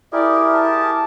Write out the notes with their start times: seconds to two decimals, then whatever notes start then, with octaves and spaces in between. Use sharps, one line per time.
0.13 E4 G4 G#4 A#4 D5
0.54 A5